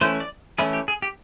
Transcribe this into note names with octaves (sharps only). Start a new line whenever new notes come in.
E3 A3 C#4 E4 C5
D5
E3 A3 C#4 E4 G#4
G4
G#4
G4